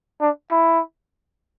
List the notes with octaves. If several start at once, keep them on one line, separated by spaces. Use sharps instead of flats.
D4
E4